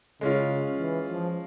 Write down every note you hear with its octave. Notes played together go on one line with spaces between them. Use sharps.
C#3 G#3 C#4 F4
E3
F3